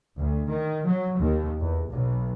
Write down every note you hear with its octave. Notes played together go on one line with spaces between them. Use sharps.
D2
D#3
F#3
D#2
E2
B1